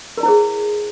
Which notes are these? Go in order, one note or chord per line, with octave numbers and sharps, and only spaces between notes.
E4 G#4 A#4 C5 D5